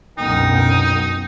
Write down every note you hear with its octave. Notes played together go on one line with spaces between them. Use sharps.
C2 F#2 B2 D3 D#4 A#4 G5